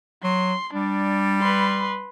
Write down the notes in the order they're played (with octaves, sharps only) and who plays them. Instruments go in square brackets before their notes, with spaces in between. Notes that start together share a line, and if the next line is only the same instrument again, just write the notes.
[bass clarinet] F#3 [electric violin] C6
[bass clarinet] G3 [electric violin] D4
[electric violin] B4 C6